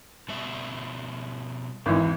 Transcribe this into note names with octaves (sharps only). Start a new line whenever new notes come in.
B2 G3 E5
G#1 E2 E3